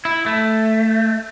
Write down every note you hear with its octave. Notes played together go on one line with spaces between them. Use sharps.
E4
A3